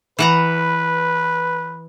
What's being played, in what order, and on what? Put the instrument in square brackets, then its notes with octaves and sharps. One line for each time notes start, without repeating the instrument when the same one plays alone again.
[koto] E3 F#5 A#5 [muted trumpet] B4